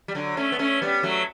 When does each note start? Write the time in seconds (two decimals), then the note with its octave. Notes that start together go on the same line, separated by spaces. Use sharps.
0.08 G3
0.15 D3 F#3
0.37 A3 C#4
0.52 B3
0.59 A3 C#4
0.82 G3 B3
1.03 F#3 A3